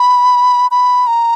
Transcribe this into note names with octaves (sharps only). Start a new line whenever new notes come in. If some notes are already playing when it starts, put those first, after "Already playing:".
Already playing: B5
B5
A#5